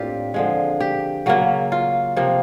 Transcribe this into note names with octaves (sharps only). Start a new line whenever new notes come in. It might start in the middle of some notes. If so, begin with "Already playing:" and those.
Already playing: A2 A#3 C4 D4 F4 G4
D3 F3 G#3
G4
C#3 F#3 A#3
F4
C3 F3 A#3